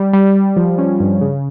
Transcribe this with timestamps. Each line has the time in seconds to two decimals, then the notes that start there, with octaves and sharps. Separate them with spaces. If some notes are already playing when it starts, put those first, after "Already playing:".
Already playing: G3
0.13 G3
0.36 G3
0.56 F3
0.78 C#4
1.00 G2
1.21 C#3